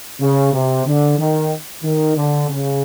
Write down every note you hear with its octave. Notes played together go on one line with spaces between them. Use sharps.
C#3
C3
D3
D#3
D#3
D3
C#3